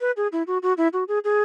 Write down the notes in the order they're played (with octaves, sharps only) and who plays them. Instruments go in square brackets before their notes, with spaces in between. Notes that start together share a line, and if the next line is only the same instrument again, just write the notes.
[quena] B4
G#4
E4
F#4
F#4
E4
F#4
G#4
G#4